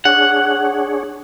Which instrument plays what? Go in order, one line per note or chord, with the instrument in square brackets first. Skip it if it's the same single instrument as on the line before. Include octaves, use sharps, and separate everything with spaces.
[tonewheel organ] D4 G#4 C#5 [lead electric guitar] F#5